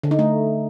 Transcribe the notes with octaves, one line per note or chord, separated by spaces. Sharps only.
D3
D#4
A3